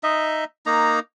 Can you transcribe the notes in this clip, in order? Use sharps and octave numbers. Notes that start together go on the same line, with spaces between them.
D#4 D#5 E5
A#3 D#4 A#5